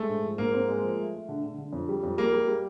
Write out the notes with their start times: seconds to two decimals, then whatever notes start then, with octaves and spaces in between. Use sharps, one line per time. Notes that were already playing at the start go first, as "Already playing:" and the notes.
Already playing: G#3 A3
0.09 G#2
0.24 F3
0.38 G#2 A#3
0.54 C4
0.68 G#3
0.84 F3
0.98 A3
1.13 A3
1.29 D3
1.43 D3
1.58 D3
1.73 F2
1.89 G3
2.03 F2
2.18 G3 A#3
2.33 G3
2.48 G3